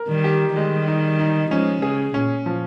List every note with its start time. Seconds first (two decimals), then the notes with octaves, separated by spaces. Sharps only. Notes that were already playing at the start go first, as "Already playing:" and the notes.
Already playing: A#4
0.08 D#3 G3
0.24 G4
0.55 D#3 G3 G#3
0.87 D#4
1.19 D#4
1.51 F3 G#3 C#4
1.82 C#3 G#4
2.14 A#2 C#4
2.46 F3